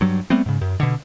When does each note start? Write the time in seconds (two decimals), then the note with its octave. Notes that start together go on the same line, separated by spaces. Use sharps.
0.01 G2 F#3
0.30 G3 A3 B3 C4
0.46 G#2 C#3
0.61 F#2
0.80 B2 D3